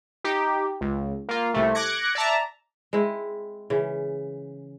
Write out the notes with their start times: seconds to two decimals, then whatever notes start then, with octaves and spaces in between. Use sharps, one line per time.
0.24 D#4 G4
0.81 C#2
1.28 A#3 F4
1.54 C2 C3 A3
1.75 D6 F#6 G#6 A#6 C#7
2.15 D5 E5 A5 A#5
2.93 G#3 C4 E4
3.70 C#3 E3